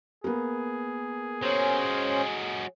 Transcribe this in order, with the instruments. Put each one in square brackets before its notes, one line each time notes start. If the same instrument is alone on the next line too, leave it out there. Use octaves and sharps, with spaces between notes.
[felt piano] A#3 B3 [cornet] G#4
[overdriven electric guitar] F#3 G#3 [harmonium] C#4 C5